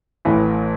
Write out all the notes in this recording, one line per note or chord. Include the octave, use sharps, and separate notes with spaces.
A1 A2 E3 E4